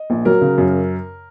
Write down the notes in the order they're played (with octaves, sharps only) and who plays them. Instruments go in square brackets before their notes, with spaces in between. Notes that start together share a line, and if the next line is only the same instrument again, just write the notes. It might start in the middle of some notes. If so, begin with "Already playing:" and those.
Already playing: [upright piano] D#5
A#1
F#3 A#4
C#3
F#2